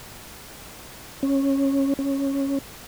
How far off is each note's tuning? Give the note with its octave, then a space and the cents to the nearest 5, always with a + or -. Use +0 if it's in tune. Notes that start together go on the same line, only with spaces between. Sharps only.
C#4 -15
C#4 -10